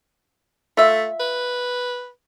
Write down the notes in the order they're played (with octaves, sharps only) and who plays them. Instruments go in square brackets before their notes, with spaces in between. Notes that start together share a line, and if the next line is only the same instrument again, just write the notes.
[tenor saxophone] A3 [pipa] F4 E5
[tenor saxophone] B4